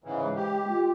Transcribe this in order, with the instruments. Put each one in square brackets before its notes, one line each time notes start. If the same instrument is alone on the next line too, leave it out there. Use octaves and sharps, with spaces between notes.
[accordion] G#2 C#3 E3
[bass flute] G#3
[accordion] G4
[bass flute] F4